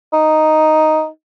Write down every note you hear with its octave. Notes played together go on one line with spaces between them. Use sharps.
D#4